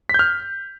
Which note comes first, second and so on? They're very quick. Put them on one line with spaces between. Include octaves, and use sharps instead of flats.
B6 G6 F6